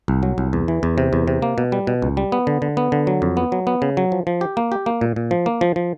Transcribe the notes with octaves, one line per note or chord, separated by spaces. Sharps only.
C2
F#3
C2
E2
E3
E2
C3
E2
C3
A#3
B2
G3
B2
C#2
G3
B3
D3
D3
B3
D3
F#3
F2
B3
F#3
B3
C#3
F#3
F3
F3
G4
A#3
G4
A#3
A#2
A#2
F3
A#3
F3
F3